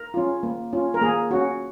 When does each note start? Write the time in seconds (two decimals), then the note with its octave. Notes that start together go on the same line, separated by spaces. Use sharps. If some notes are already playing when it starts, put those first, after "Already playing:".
Already playing: A#4
0.14 C#4 F4
0.43 A#3
0.73 C#4 F4
0.94 A#4
1.02 A#3 G#4
1.31 C#4 F#4